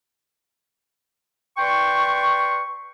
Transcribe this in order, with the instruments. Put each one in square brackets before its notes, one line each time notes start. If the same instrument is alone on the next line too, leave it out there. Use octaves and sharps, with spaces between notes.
[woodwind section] B4 D5 G5 C6 C#6